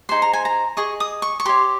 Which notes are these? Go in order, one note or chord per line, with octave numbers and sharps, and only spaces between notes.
D#4 G#4 C5 C6
A#5
G#5
A#5
G#4 D#5 C#6
D#6
C#6
C#6
G4 C#5 C6